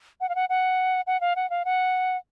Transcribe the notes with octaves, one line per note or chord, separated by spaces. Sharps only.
F#5
F5
F#5
F#5
F#5
F5
F#5
F5
F#5